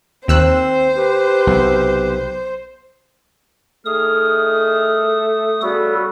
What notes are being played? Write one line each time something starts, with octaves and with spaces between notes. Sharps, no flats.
D#2 C4 C5 E6 F#6
G4 B4
B1 C3
D#3 A3 G#4 D#6 F6
C#3 G3 B3 F#4 A4